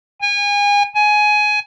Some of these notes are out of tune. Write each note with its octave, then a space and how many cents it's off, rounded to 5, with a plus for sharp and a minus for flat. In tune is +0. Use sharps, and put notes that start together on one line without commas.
G#5 -30
G#5 +15